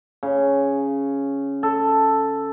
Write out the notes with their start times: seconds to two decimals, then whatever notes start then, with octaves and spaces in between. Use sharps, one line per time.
0.23 C#3
1.63 A4